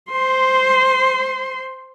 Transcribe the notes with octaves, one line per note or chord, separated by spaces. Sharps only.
C5 C6